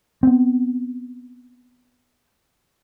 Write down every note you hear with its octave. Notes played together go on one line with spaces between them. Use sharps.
B3 C4